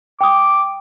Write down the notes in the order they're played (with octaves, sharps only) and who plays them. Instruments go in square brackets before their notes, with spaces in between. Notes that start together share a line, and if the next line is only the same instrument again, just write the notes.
[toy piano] G5 D#6 [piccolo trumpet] D6